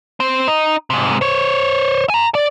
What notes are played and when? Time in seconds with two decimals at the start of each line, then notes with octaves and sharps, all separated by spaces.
0.20 C4
0.48 D#4
0.90 G#2 C3
1.21 C5 C#5
2.10 G#5 A#5
2.35 D5